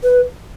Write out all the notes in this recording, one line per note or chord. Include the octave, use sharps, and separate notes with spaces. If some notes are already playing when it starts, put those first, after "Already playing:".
B4